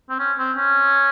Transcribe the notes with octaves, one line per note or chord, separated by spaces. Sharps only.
C4
C#4
C4
C#4